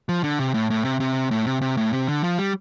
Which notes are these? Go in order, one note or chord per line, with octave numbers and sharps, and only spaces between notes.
F3
D3
C3
A2
A2
C3
C3
A2
C3
C3
A2
C3
D3
F3
G3